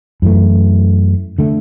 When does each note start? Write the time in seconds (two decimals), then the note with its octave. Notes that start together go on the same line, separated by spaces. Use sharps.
0.22 F#2 E3 A3
1.38 D3 A3